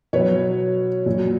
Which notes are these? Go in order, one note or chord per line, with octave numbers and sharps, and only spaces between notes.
B2 F#3 B4 C#5
A#2 F#3